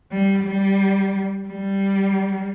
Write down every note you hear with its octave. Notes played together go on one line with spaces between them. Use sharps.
G3
G3
G3